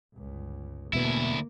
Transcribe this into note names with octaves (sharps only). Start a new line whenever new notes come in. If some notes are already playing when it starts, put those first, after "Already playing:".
G1 C#2
E1 D2 B2 A#3 B3 E4